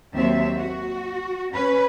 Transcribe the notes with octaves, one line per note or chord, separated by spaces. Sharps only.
D#2 F#3 C4 E5
F#4
C#4 B4